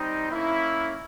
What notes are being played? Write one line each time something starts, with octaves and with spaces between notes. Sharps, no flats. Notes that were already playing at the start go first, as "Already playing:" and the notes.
Already playing: G3 C4 D#4
A#3 C#4 E4